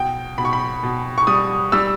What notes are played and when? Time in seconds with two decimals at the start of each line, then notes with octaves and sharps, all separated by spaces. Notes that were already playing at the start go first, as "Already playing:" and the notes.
Already playing: B2 G5
0.38 B2 B5
0.45 C#6
0.53 B5
0.83 B2
1.18 C#6
1.27 G3 D#6
1.72 G3 E6